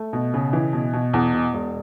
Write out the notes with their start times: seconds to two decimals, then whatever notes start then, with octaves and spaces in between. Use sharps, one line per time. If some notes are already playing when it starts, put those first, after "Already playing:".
Already playing: A3
0.13 B2
0.34 C#3
0.53 E3
0.73 B2
0.93 B2
1.13 E2
1.34 B2
1.54 E1